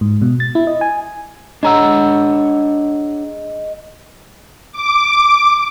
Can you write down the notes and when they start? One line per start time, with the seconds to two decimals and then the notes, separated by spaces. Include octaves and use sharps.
0.01 G#2
0.22 B2
0.40 A6
0.55 E4
0.67 D#5
0.81 G#5
1.63 G#3 D4 C#5 D#5 F#5 A#5 E6
4.72 D6